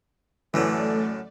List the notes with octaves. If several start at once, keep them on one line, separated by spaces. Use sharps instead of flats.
F#2 A2 D3 E3 A3 A4 D5